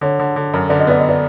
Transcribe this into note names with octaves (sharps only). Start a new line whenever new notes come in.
D3 C#5
D3
D3
F#2
D3 D5
D#5
B3 D5
D#5
D5